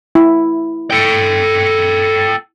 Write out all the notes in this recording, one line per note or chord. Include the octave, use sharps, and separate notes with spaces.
E4
A4 G5